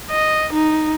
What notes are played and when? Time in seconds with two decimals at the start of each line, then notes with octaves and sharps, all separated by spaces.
0.10 D#5
0.53 D#4